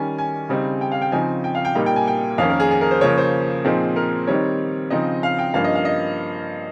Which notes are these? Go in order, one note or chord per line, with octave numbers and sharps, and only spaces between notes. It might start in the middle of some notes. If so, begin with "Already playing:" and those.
Already playing: D#3 G3 C#4 G#5
G#5
C#3 G3 C4 D#4
G5
F5
G5
C#3 F3 C4 D#4 G#5
G5
F5
G5
A#2 G3 A#3 D#4
G5
G#5
G5
F2 D#3 A#3 C#4 F5
A#4
G#4
G#4
A#4
C5
C#3 F3 A#3 C#5
C5
A#2 F3 C4 D#4 G#4
A#4
D#3 G3 C4 D#4 C#5
C#3 F3 C4 D#4 D#5
F5
G5
G2 F3 A#3 C#4 F5
D#5
F5
D#5